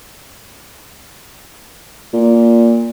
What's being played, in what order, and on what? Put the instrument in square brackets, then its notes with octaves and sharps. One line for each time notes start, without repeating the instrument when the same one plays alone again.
[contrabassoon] A#2